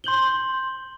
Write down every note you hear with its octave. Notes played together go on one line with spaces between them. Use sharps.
C6 G6 F#7 G7